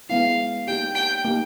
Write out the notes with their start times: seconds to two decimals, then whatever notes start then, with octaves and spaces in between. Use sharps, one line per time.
0.09 G#3 B3 E4 F5
0.67 A#3 D#4 G4 G5
0.95 G5
1.25 A#3 D#4 G4